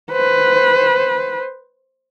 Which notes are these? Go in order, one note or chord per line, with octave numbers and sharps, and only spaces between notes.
B4 C5